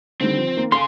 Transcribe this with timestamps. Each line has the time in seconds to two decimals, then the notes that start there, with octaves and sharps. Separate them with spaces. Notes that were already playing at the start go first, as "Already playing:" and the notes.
0.21 D3 D#3 G3 C4
0.37 F3
0.56 D#3 A#3
0.72 C#4 G#4 A4 F5 C6